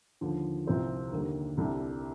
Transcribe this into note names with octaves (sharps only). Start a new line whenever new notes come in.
D#2 D3 F3
C2 C3 F3 C4 F4
D#2 D3 G3 A#3
C2 C3 G3 D4 A4